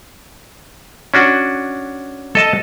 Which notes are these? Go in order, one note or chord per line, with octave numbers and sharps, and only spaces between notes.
C#4 D4 F#4
A4 D#5 A5